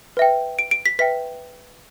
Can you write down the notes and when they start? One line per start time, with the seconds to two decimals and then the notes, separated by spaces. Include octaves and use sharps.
0.17 B4 E5 G5
0.59 D7
0.71 D7
0.86 B6
0.99 B4 E5 G5 B6